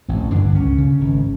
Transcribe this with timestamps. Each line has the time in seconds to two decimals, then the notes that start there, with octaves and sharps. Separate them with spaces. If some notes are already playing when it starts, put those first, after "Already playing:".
0.09 A1 C4
0.32 G2 D3 D4
0.55 C#2 C#4
0.78 C#3
1.01 G#1